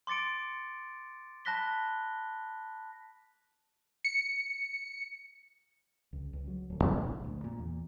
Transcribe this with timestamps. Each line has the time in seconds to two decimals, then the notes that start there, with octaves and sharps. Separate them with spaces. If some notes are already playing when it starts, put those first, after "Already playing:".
0.07 C6 D6 A6 C#7 D7
1.45 A5 B5 F#6 A#6 B6 G7
4.04 C#7
6.13 C#2
6.33 C#2
6.47 F#3
6.70 D1
6.85 C#2
7.02 A#1
7.24 D2
7.44 A#2
7.59 E2